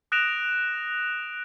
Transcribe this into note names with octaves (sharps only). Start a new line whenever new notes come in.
D#6 F#6 A#6 D7 E7 F7